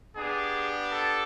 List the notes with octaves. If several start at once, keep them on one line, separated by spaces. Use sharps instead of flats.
B3 D4 G4 G#4
A4